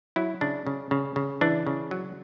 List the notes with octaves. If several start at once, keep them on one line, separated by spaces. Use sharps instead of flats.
F#3 E4
C#3 D4
C#3
C#3
C#3
E3 D4
C#3
F#3